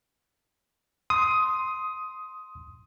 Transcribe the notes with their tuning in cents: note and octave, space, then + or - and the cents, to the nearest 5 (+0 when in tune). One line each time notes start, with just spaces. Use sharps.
C6 +0 D#6 +15